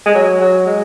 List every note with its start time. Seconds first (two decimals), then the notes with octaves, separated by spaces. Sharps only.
0.06 G#3
0.14 F#3
0.41 F#3
0.66 G#3